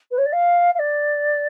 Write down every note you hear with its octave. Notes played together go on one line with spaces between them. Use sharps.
B4
C#5
D5
F5
F5
D5